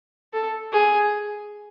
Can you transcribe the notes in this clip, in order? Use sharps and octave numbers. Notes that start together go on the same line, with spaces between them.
A4
G#4